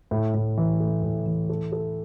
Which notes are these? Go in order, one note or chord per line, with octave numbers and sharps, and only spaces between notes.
A2
A2
E3
A3
A2
E3
A4
A4